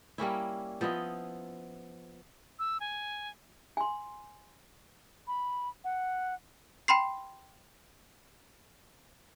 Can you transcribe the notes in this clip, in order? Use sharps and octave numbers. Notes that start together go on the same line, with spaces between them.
G3 A#3 C#4 E4
F3 B3 E4 D#5
E6
G#5
G#5 C6
B5
F#5
G5 B5 C6 C7